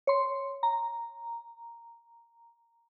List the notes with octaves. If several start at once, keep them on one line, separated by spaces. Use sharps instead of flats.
C#5 C6
A#5